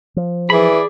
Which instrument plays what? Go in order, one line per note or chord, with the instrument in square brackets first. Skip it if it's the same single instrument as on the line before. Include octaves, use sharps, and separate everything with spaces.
[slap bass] F3
[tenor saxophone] E3 [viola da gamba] G#4 [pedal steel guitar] D5 B5